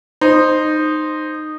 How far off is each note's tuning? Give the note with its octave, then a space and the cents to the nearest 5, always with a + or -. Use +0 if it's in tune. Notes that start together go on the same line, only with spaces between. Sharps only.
D#4 -15 C5 +0